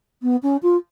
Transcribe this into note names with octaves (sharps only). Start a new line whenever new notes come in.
B3
C#4
F4